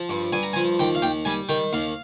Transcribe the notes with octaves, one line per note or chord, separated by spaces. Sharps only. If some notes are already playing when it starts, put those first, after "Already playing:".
Already playing: F3
G2
G2 G#5
A#5
G#5
F3
D#2 G5
F5
D#2 G5
G3 G#5
D#3 G5
D#2 F5